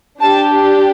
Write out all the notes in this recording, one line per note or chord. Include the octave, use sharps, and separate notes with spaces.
D4 G4 A5